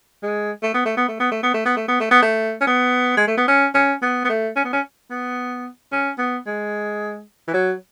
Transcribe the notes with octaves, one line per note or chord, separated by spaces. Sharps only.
G#3
A3
B3
A3
B3
A3
B3
A3
B3
A3
B3
A3
B3
A3
B3
A3
C#4
B3
G#3
A3
B3
C#4
C#4
B3
B3
A3
C#4
B3
C#4
B3
C#4
B3
G#3
E3
F#3